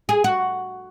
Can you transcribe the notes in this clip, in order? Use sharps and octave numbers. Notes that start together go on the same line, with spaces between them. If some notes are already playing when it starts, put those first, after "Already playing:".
G#4
F#4